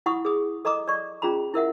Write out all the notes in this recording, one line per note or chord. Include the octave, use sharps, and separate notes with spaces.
E4 F#5 B5 C#6 D#6
G#4 D#6
A4 D#5 A#5 D6 D#6
D5 C#6
C#4 F4 G#4 A#5 B5
E4 A#4 E5 F#5